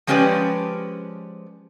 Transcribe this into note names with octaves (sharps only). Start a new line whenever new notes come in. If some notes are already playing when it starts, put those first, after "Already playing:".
F3 G#3 C#4 G4 B4 D5